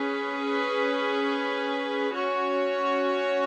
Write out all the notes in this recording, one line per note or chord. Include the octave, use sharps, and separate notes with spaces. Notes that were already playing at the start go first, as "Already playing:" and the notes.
Already playing: C#4 G#4 B4
C#4 F#4 C#5